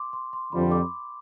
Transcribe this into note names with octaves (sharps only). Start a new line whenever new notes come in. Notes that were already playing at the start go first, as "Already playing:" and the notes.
Already playing: C6 D6
C6
C6
F2 D3 G3 B5
D6